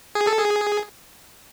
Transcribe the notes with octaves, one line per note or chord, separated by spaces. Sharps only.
G#4
A4
G#4